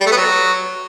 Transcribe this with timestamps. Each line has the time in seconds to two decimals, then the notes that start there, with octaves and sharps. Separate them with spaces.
0.01 G3
0.06 A3
0.11 B3
0.17 F#3